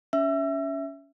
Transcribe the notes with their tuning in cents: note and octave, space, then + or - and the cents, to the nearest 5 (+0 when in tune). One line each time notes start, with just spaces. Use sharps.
C#4 +20 E5 +0 E6 +35